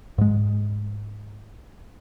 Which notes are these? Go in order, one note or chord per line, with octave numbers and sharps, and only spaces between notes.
G#2 G#3